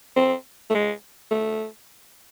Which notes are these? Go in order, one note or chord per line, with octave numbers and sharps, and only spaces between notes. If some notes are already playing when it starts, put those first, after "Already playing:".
C4
A3
G#3
A3